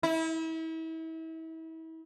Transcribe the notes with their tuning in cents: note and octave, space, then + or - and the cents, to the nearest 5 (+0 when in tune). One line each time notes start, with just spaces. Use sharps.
E4 -35